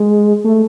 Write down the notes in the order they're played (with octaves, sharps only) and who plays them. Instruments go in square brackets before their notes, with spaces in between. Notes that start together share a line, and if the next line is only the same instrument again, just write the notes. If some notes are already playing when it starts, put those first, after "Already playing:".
Already playing: [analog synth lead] G#3
A3